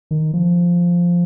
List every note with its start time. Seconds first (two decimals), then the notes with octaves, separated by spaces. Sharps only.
0.11 D#3
0.33 F3